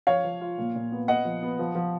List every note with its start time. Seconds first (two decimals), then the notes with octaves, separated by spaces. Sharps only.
0.07 F3 C#5 F5
0.24 F3
0.41 F4
0.58 A#2
0.75 A#2
0.92 B3
1.08 B3 D#5 F#5
1.25 F3
1.43 B3
1.59 F3
1.75 F3